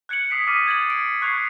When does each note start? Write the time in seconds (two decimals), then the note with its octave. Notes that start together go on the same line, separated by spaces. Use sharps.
0.09 F#6 G#6 C#7 D7 F#7
0.30 D#6 E6 B6 C7 D7
0.47 D6 D#6 F6 A6 B6 D#7
0.66 D#6 G#6 A6 D7 F#7
0.90 D7
1.22 C#6 F#6 G#6 C7 F7